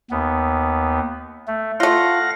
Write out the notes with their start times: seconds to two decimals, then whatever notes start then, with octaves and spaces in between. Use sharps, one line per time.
0.11 D#2 B3
1.47 A3
1.80 A3 F4 F5 F#5 A#6